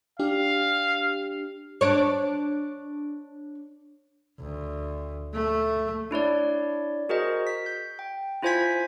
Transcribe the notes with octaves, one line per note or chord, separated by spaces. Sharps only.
D4 G4 F5
D4 C#5
D2
A3
D4 E4 C#5 D5
F#4 G#4 A#4 C5 D#5
B6
G6
G5
E4 F4 C5 G#5 G#6 B6